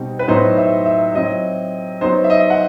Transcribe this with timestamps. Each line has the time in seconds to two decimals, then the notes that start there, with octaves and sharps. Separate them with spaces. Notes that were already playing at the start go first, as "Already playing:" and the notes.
Already playing: B2 G3 C4 D#4
0.19 B4
0.28 A2 F#3 B3 D#4 C5
0.57 E5
0.86 E5
1.15 F#3 C4 E4 D#5
2.01 F#3 B3 D#4 C5
2.24 E5
2.30 D#5
2.50 F#5